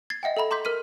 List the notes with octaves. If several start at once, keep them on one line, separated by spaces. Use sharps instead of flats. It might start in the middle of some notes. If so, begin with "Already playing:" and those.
G#6 A6 C7
D#5 E5 F#5 G5
A4 E5 A#5 B5
A#5 C6 D6 G6 B6
A#4 F6 B6 D#7